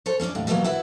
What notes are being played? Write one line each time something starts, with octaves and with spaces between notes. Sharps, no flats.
A4 C5 C#5
C#4 D4 E4 D5
D#2 A2
B2 D3 E3 F#3 A#3 B3
E4 F#4 A4 B4 F#5